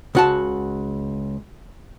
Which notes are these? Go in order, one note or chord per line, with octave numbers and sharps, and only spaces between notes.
C#2 F#4 A5